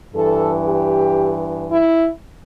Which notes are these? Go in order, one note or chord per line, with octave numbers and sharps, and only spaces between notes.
G2 E3 A4
G4
E4